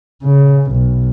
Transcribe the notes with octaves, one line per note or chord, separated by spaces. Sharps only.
C#3
B1